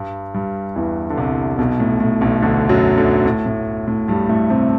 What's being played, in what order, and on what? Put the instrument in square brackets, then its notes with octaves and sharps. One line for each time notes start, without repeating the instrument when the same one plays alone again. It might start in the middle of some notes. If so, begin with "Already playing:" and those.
Already playing: [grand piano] G2 G3
G2 G3
E2 E3
D3
C2 C3
B1 B2
A2
A2
B1 B2
D2 D3
F#2 F#3
D2 D3
A2
A2
A2
G2 G3
A2 A3
C3 C4